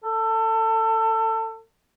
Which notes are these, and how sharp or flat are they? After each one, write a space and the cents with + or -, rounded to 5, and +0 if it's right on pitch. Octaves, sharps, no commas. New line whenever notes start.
A4 +25